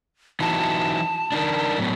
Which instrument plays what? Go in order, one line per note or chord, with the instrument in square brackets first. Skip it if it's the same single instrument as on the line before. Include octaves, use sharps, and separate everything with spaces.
[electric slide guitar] E3 D#4 F#4 [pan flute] A5
[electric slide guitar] D4 D#4 A#4
A2 F#3 B3